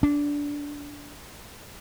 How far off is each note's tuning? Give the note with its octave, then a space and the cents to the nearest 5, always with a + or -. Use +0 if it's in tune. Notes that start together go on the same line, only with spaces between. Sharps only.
D4 -15